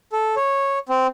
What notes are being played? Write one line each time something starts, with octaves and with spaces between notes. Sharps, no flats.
A4
C#5
C4